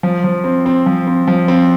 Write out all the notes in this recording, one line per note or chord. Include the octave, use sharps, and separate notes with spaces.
F3
F3
C4
C4
F3
C4
F3
C4